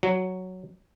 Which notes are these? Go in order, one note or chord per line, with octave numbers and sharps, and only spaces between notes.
F#3